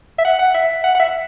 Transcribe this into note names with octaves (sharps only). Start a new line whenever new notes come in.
E5
F#5
F#5
E5
F#5
F#5
E5